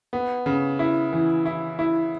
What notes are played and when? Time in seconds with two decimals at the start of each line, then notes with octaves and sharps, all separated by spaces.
0.13 B3
0.46 C#3
0.79 E4
1.13 E3
1.46 E4
1.79 E4